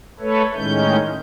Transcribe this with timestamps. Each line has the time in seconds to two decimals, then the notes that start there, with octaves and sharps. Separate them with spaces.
0.20 A3 A4 B4 C#5
0.56 A2 D#3 G#3 C#4 G6